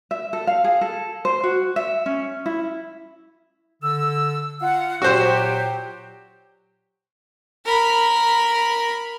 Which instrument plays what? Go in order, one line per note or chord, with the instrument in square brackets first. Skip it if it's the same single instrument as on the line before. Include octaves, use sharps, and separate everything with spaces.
[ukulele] E5
A4
F5
G#4
A4
C5
F#4
E5
C#4
E4
[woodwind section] D3 E6
F4 F5 F#5
[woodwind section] A#2 F#3 G4 [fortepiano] F#4 C5
[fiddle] A#4 B5